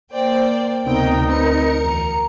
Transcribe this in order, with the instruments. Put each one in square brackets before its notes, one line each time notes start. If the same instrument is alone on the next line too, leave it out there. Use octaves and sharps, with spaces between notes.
[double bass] A#3 [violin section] C5 D5 G5
[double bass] D2 [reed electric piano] C3 B3 C4 [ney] D#4 [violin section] A#4 G5
[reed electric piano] C4 B4 [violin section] A#4 C#7
[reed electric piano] E2 [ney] A#5